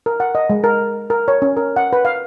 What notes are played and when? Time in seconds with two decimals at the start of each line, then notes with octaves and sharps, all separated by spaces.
0.06 A#4
0.20 F#5
0.35 D#5
0.50 G#3
0.64 A#4
1.10 A#4
1.28 C#5
1.42 C#4
1.57 A#4
1.76 F#5
1.93 B4
2.05 F5